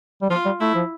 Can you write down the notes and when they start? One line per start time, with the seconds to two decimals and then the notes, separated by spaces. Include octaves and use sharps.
0.22 G3
0.30 F3 F4
0.45 G3
0.60 A3 E4
0.75 F3